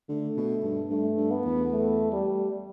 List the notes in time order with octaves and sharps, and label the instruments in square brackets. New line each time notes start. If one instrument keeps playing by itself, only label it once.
[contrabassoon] D3 [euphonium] A3
[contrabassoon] B2
G2
[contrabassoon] G2 [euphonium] A3
[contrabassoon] G2
[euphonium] B3
[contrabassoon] E2
[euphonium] A3
G3